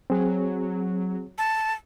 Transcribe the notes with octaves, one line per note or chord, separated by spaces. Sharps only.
F#3 C4 G#4
A5